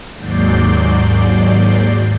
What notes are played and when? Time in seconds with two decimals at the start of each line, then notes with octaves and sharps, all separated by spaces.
0.17 D#2 G#2 F#3 D5 G6 C7